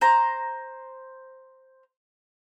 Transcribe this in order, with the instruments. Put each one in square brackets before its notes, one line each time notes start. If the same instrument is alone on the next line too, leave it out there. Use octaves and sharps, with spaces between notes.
[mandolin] C5 A#5